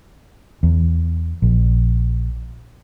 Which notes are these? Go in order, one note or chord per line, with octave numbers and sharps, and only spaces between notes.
E2
A#1